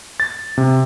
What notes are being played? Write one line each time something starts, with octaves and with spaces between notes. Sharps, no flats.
A6
C3